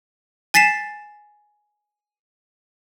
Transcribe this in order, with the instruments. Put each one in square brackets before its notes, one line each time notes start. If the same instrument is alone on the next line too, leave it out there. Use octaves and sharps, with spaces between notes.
[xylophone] G#5 A6 B6 C7 E7